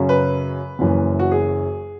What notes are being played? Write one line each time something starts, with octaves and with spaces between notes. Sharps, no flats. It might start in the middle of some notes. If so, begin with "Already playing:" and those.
Already playing: F#2 C#3 F#3 C#4
B4
F#1 F#2 E3
F#4
G#4